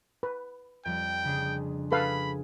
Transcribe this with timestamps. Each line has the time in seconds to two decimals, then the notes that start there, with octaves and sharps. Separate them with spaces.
0.23 B4
0.86 F2 G3 G5
1.25 C#3 D4 G#4
1.92 G#4 A4 B4 F5 B5